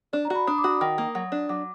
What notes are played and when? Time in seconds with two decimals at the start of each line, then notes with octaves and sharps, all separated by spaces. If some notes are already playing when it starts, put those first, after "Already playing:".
0.13 D4 D5
0.25 A#5
0.30 F#4
0.35 B5
0.47 D4 D#6
0.58 D6
0.64 F#4 D#6
0.81 D#3
0.98 A#3
1.15 F#3
1.32 D4
1.49 F#3 D6